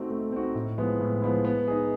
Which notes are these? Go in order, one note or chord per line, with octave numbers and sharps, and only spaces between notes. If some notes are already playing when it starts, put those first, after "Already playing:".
Already playing: A3 C4 D#4 F#4
A3
C4 D#4 F#4
A2
F3 G#3 B3 E4
A2
F3 G#3 B3 E4
B3
D#4 G#4